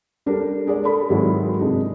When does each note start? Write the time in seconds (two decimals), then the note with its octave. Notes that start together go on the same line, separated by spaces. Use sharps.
0.26 G3 D4 G4 A4 A#4
0.67 G#3 D5
0.84 A4 A#4 B5
1.10 G#2 D#3 F#3 G#3 C4 E4
1.59 C3 G#3 D4 D#4